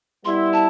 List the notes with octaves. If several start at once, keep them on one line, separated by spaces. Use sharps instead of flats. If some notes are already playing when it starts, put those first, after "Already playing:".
G3 B3 E4 C6
A5